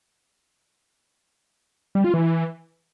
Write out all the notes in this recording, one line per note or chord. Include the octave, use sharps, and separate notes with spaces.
G3
F4
E3